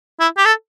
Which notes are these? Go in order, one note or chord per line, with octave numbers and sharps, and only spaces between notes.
E4
G4
A4